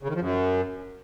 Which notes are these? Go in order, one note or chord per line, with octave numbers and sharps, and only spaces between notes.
C#3
D#3
F3
F#2